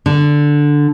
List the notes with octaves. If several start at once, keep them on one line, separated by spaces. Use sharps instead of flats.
D3